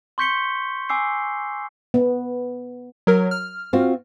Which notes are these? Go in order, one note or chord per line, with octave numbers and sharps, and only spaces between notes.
C6 C#6 G6 B6 C#7 G7
G#5 D6 E6 C7
B3
F#3 A#4
F6
C4 F4 F#4